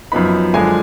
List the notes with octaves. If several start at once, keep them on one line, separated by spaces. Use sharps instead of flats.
F#2 F3 B3 D#4 B5
F#2 D3 F3 G#3 D4 G#5